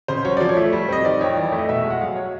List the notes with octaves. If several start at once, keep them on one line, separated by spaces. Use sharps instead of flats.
C#3 C5
F#3 C#5
F3 D5
C#5
A3
G3
C4 D#5
D#3 D5
F2 C#5
E3 D5
A3
D#5
B2 E5
G#3
F#5
F#3 F5
C#5